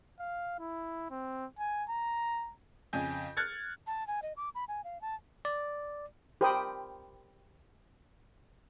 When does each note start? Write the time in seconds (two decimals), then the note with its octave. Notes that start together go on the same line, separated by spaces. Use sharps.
0.20 F5
0.59 E4
1.11 C4
1.59 G#5
1.90 A#5
2.93 F2 C#3 G#5 G6
3.37 F6 F#6 G#6 A6 C#7
3.87 A5
4.07 G#5
4.22 D#5
4.37 D6
4.55 B5
4.68 G#5
4.84 F5
5.01 A5
5.45 D5
6.41 G4 A#4 C5 G5 B5 D#6